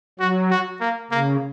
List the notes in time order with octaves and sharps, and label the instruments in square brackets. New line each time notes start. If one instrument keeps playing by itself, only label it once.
[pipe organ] F#3 [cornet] F#4
[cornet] F#4
A#3
[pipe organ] C#3 [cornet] A#3